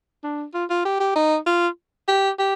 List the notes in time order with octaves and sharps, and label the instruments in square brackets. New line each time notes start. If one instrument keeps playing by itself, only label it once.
[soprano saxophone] D4
F4
F4
G4
G4
D#4
F4
G4
G4